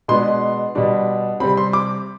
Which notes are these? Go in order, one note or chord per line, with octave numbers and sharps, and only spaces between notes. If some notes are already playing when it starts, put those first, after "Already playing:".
B2 G#3 B3 D4 C6
B2 G3 D4
C3 G3 C4 B5
C6
D6